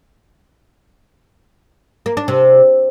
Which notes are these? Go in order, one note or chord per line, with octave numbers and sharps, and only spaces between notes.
A#3
D4
C3